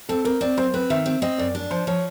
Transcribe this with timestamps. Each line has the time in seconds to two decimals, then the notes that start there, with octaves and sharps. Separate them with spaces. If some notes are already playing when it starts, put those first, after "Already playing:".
0.09 C4 A4
0.25 C4 A#4
0.41 C4 D5
0.57 F#2 C5
0.74 C4 B4
0.90 D#3 E5
1.06 C4
1.22 C4 D#5
1.38 F#2 D5
1.55 D4
1.71 F3 C5
1.87 F3 C#5